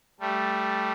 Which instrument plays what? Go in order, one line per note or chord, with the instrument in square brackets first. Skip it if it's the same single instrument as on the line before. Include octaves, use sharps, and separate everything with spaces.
[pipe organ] G3 A3